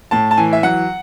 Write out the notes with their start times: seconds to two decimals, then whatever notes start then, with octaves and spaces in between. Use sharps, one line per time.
0.11 A2 A5
0.31 A5
0.37 E3 G#5
0.53 E5
0.63 F#3 F#5